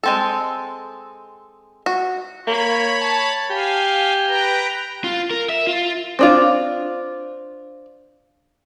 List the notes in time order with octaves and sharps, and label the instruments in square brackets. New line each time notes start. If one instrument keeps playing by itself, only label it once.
[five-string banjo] G#3 C4 A4
F#4
[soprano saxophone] A#3 [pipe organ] C#5 B5
[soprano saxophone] A5
[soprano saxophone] G4 [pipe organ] F5 G#5
[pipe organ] B4 G5 A#5
[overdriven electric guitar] F4
A#4
E5
F4
[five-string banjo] C4 D4 F4